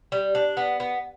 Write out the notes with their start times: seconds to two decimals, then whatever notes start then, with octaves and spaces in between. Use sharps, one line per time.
0.12 G3
0.35 D4
0.57 B3
0.80 B3